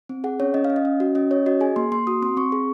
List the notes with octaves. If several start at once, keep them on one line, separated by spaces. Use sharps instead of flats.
C4
G#4 F#5
C#4 C#5
C#4 D#5
F5
C#4
D#5
C#4
F#4
C#4 D#5
C#4 C#5
F#4 D#5
G#4 G#5
A#3 C6
A#3 C6
F#4 D#6
C4 C6
C4 C#6
G#4